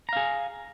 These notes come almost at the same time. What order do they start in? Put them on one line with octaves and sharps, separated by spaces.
A#5 F5 G#4